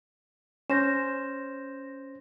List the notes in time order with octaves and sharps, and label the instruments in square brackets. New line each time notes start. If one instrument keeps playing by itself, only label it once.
[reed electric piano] C#4 C5 [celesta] G6 A#6 E7